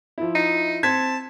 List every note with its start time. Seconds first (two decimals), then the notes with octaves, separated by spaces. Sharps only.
0.18 F3 E4
0.35 D#4
0.83 C4 A5 G#6 B6